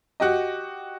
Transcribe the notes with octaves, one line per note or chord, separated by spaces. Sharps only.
F#4 G4 D#5